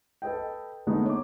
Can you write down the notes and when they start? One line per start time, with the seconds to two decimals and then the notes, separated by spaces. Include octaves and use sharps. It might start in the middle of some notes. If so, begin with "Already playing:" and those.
0.22 A4 B4 D#5 G5
0.87 D3 G#3 A3 B3 D#4
1.05 C#5 D6